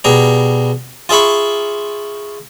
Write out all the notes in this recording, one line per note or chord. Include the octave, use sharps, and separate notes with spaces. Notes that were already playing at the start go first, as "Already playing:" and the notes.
B2 G3 G#4 A#5
F4 G#4 E5 B5 C#6